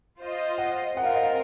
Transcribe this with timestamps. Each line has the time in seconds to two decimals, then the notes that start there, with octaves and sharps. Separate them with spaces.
0.21 F4 C5 D#5
0.58 F#5
0.96 C4 F4 A#4 F#5
1.05 F5
1.15 D#5
1.23 F5